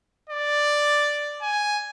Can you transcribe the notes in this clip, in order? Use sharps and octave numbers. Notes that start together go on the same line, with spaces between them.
D5
G#5